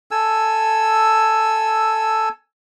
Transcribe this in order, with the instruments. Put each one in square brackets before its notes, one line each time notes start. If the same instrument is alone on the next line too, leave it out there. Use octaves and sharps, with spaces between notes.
[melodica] A4 G#5 E6